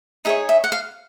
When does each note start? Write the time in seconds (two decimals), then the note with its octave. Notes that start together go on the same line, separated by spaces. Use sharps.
0.25 D#4 G#4 C#5 E5
0.49 E5
0.64 F#5
0.72 F5